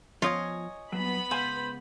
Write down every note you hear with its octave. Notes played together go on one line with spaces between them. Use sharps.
F3 B3 F4 C#5 D#5 G#5
G2 A#2 F#3 B3 B5
C#2 C5 F5 G#5